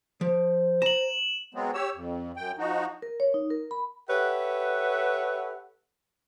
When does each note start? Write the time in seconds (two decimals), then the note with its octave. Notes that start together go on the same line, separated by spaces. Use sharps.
0.21 F3 C5
0.82 A#5 E7 F#7
1.54 F#3 G#3 B3 C4
1.74 G4 C#5 E6
1.95 F2
2.37 F#2 G5
2.59 F3 D#4 F#4
3.02 A#4
3.20 C#5
3.34 D#4
3.50 A#4
3.71 B5
4.09 G4 A4 B4 C#5 E5 F#5